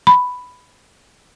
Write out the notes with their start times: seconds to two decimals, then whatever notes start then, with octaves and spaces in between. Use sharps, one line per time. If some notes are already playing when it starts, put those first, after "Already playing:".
0.07 B5